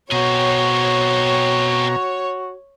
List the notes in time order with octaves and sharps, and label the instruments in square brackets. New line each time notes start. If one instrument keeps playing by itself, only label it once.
[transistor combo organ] B2 A#5 [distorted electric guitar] C4 G#4 [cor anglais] F#4 [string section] C#5